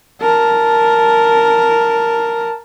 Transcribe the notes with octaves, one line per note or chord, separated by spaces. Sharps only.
A#4 A5